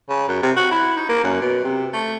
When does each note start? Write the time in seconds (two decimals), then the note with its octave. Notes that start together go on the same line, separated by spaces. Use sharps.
0.09 C#3
0.28 F#2
0.43 C3
0.57 F#4
0.71 E4
0.96 D#4
1.09 A#3
1.24 F#2
1.41 B2
1.64 C3
1.93 A3